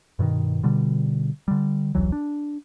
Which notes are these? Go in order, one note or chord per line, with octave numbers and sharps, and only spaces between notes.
G2 B2 D3 D#3
B2 D3 G3
D3 G3
E1 C2 E3 F#3
D4